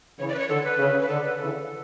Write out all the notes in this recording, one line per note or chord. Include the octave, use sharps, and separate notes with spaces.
C#3 E3 C#5
D5
B4
C#5
D3 A4
B4
C#3
B4
D3 A4
B4
C#3 E3 A4